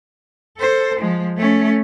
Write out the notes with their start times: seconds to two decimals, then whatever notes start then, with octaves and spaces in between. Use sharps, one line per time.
0.58 A4 C5
1.00 F3 G#3
1.37 A3 C#4